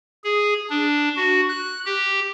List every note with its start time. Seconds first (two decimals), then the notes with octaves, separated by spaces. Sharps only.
0.24 G#4
0.70 D4
1.16 F#4
1.49 F#6
1.86 G4